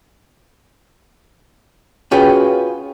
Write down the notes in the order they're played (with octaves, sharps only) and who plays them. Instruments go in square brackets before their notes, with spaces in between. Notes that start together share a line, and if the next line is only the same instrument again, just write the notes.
[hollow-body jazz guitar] C#4 F4 F#4 G#4 B4 G5